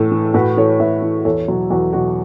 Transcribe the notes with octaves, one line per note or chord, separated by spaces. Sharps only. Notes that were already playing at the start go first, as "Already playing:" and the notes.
Already playing: A2 E3 A4
E3
A2 F#4 B4
E3 A4 C#5
A2 B4 E5
E3
E2 A4 C#5
B2 F#3
E2 F#4
B2 F#3 F#4